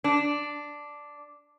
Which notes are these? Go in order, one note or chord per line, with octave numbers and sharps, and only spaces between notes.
D4